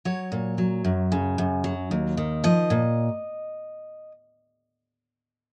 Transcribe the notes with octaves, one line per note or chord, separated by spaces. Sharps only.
F#3 C#5
A#2
F#3
F#2
C#3
F#2
F#3
D#2
D#3
F3 D#5
A#2